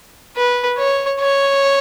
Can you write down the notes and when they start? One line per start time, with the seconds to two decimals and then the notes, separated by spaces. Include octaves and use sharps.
0.36 B4
0.78 C#5
1.20 C#5